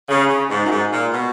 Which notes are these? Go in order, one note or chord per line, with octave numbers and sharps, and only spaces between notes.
C#3
C#3
G#2
F#2
G#2
A#2
B2